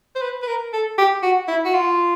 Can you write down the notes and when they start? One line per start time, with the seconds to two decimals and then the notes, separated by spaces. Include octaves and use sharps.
0.15 C5
0.22 B4
0.42 B4
0.47 A#4
0.73 A4
0.98 G4
1.23 F#4
1.48 E4
1.65 F#4
1.74 F4